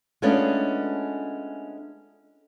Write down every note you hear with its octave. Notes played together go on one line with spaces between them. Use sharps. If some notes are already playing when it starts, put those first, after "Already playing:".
G#3 A3 B3 C#4 D4 F4